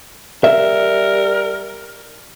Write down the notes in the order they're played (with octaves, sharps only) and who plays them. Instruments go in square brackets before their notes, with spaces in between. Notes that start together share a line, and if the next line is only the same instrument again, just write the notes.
[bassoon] G3 [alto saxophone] A#4 [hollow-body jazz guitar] E5